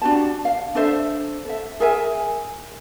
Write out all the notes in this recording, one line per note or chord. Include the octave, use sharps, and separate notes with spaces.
D4 F#4 G4 A5
F5
D4 A4 C5 E5
A4 E5
G#4 A#4 E5 G#5